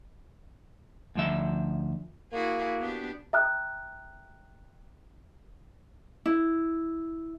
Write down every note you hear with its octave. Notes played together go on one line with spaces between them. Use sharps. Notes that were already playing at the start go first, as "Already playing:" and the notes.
D2 F3 E5
A#3 E4 F#4 G#4
B3 D4 G4
E5 G5 A#5 D#6 F6 F#6
E4